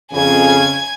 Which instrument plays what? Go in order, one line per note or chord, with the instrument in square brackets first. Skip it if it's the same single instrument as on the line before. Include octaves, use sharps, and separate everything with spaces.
[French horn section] F2 C#3 [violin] G#5 G#6